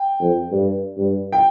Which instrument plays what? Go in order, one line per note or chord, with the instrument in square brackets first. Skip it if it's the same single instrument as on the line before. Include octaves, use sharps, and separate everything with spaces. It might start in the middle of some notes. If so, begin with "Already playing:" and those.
Already playing: [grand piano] G5
[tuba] F2
G2
G2
[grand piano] G5